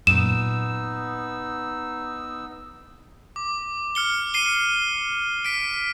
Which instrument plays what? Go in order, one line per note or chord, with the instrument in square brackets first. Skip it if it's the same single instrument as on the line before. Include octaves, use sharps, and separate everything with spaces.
[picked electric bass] F#2 A#2 [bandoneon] B3 D#4 E6 [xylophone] E7
[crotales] D6
F6 C#7 G7
C7 D#7 G7
B6 D7